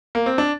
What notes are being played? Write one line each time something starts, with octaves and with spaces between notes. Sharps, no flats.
A#3
C4
D4